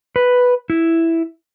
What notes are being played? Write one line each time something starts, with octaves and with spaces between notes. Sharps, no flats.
B4
E4